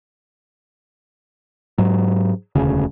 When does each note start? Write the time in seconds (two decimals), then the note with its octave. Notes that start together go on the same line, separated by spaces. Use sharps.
1.78 G#2 F#3
2.55 E1 D2 C#3